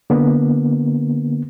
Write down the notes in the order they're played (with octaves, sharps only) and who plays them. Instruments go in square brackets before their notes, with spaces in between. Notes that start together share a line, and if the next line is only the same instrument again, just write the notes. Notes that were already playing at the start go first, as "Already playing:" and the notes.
[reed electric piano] D3 A#3 B3